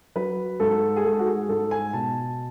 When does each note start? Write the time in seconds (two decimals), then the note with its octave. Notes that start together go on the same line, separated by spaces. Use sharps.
0.16 F#3 B4
0.60 G#2 A4
0.96 G#4
1.05 G#2 A4
1.19 F#4
1.26 G#4
1.49 G#2 A4
1.71 G#5
1.93 B2 A5